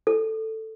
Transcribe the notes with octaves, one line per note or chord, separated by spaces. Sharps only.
A4